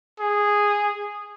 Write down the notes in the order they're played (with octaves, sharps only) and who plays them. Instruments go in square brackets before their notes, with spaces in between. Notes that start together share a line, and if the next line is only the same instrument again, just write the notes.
[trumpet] G#4